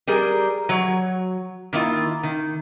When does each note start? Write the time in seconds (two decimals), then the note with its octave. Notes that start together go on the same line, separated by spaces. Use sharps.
0.07 G3 G#4 A#4
0.69 F#3 C#5
1.73 D#3 A#3 E4 F4
2.23 D#3